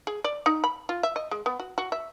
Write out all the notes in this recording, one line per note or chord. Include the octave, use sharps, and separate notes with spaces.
G#4
D5
D#4
B5
F4
E5
D#5
G#3
B3
F#4
F#4
E5